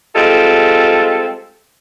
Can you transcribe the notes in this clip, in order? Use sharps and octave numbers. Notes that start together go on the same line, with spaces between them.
G3 G#3 C4 F4 A4